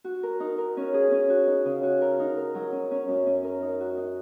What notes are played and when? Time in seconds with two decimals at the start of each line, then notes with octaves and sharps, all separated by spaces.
0.04 F#4
0.23 A#4
0.40 D#4
0.58 A#4
0.77 C#4
0.94 G#4
1.11 C#4
1.30 F#4
1.47 D#4
1.65 C#3
1.83 F#4
2.02 A#4
2.19 D#4
2.37 A#4
2.55 F#3
2.72 C#4
2.91 C#4
3.08 F#2
3.26 C#4
3.45 A#4
3.62 D#4
3.80 F#4
3.97 D#4